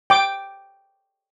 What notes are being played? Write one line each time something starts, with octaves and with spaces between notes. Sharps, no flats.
G5 D6